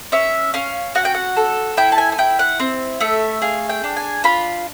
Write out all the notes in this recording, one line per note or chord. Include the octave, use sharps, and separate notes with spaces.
C#4 E5
C#4 F5
F#4 F#5
G5
F#5
A4
E4 G5
A5
G#5
G#5
E4 G5
F#5
C4
A3 E5
G#4 F5
G5
D4
G#5
F4 B5